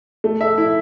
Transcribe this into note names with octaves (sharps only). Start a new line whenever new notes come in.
A3
E5
E4